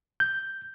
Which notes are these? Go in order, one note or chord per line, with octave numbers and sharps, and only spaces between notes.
G6